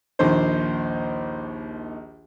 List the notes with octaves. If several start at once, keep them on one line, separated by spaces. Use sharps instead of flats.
A#1 D#2 D#3 C5